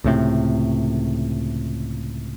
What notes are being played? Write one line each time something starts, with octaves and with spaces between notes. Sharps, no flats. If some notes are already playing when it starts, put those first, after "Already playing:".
C#2 A2 C3